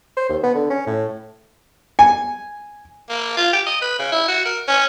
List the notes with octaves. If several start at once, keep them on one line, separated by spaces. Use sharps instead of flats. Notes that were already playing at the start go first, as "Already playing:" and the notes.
C5
D#2
B3
D3
C#4
A2
G#5
A#3
F4
G4
D#5
B4
C#3
E4
F#4
A#4
C#4